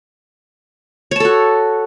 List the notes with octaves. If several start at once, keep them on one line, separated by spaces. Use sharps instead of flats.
F#4 A4 C#5 A5